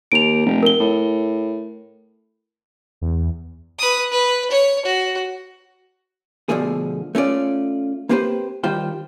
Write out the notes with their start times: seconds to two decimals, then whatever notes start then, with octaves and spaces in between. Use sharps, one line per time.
0.12 D#2 D7 F7
0.46 F1
0.63 A#4 G7
0.80 A2
3.02 E2
3.79 B4 D#6
4.12 B4
4.50 C#5
4.86 F#4
6.49 B2 D3 F3 A3 G#4
7.15 A3 C#4 F4 D5
8.09 A#3 C4 G4 G#4 B4 C5
8.64 D#3 G3 F4 C5 G5